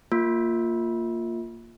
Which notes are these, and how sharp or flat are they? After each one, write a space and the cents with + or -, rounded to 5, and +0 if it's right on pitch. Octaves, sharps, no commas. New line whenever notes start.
A#3 -15 F4 +0